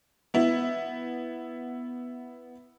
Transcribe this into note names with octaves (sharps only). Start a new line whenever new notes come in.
B3 E4